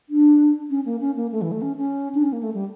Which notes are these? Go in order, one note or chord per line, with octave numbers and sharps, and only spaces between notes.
D4
C#4
A#3
C#4
A#3
A3
E3
A3
C#4
C#4
D4
C#4
A#3
A3
G3